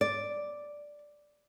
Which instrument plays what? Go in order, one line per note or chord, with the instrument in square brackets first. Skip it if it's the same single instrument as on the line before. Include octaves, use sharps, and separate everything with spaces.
[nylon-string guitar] D5